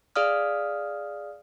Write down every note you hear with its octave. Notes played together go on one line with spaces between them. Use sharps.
G#4 D5 F5 D#6 F6